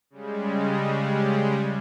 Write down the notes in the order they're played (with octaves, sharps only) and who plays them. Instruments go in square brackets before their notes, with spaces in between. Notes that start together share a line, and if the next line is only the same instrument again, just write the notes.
[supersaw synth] C#3 G3 G#3